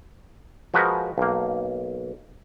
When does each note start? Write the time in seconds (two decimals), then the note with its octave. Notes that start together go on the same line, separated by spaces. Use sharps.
0.74 F3 G#3 F#4 A#4 B4
1.18 B1 A#3